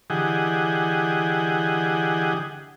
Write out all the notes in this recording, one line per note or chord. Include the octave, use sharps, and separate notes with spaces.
D3 E3 G4 G#4 D#5 F#5